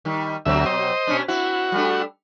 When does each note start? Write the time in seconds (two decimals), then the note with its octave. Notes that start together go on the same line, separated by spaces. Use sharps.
0.05 D#3 G3
0.45 D2 B2 F#3 C4 E5
0.66 C5 D#5
1.07 B2 C#4 D4
1.28 C4 E4 F#4
1.72 G3 A3 D4